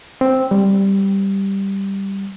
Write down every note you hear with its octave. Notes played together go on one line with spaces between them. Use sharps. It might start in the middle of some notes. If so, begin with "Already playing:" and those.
C4
G3